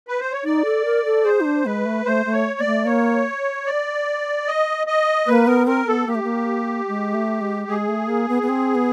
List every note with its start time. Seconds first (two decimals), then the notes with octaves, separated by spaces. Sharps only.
0.08 B4
0.20 C5
0.32 C#5
0.44 D#4 D5
0.65 A4
0.85 A#4
1.05 A4
1.24 G#4 C5
1.41 D#4
1.45 D4
1.65 G#3 B4
1.85 A3
2.05 A3 C5
2.26 A3
2.32 C#5
2.59 A#3 D5
2.66 A3
2.85 A#3 C#5
3.66 D5
4.47 D#5
4.87 D#5
5.27 A#3 B4
5.46 B3 A#4
5.67 C4 A#4
5.87 B3 A4
6.07 A#3 G4
6.15 A3
6.23 A#3
6.88 G#3
7.14 A3
7.41 G#3
7.68 G#3 G#4
7.88 A3
8.08 A#3
8.29 B3
8.42 B3
8.49 C4
8.75 B3